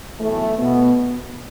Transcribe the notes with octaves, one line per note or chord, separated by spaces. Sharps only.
B1 A2 E3 A3
B2 B3